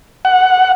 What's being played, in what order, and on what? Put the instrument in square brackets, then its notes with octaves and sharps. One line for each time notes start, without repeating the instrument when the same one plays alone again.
[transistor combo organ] F#5